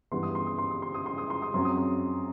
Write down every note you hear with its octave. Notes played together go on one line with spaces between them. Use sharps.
G2 E3 B3 C6
D#6
C6
D#6
C6
D#6
C6
D#6
C6
D#6
C6
D#6
F#2 F#3 C4 C6
D#6
C6